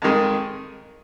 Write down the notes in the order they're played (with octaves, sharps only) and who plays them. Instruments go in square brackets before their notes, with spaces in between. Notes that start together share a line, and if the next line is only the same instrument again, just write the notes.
[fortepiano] F2 D#3 G#3